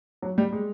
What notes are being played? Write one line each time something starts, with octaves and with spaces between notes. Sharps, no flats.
F#3
G3
G#3